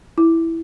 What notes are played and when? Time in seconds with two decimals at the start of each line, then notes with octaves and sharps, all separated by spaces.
0.18 E4